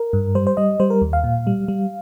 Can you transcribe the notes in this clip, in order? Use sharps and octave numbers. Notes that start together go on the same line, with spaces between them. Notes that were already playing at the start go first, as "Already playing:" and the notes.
Already playing: A#4
G2
G3 C5
C5
G3 D#5
G3 C5
A#4
D#2
F5
A#2
G3
G3